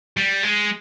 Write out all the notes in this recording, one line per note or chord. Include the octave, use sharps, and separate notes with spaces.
G3
G#3